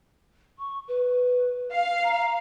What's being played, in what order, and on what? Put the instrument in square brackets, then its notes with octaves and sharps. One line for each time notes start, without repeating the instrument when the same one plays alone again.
[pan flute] C#6
B4
[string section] F5
[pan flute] A#5